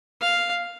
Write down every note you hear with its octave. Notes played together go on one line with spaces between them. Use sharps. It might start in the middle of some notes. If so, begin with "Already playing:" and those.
F5